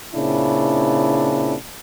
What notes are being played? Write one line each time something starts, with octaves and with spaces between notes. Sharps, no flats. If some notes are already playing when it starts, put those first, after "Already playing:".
A#2 C#3 C4 D4 E4